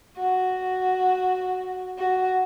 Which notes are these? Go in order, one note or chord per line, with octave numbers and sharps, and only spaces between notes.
F#4
F#4